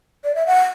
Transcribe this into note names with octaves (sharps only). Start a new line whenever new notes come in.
D5
E5
F#5